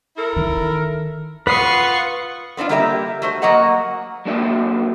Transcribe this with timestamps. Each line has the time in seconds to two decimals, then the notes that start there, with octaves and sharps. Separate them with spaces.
0.17 E4 A4 A#4
0.36 D#3
1.47 F4 B4 F#5 C#6 D#6 C7
2.57 B3 C4 D4 F4
2.69 G3 A#3 G4 A#4 D5 E5
3.22 A3 F#4 C5
3.42 F#3 A#3 F#4 D#5 F#5 A#5
4.25 F#3 A#3 D4 F#4 D5 E5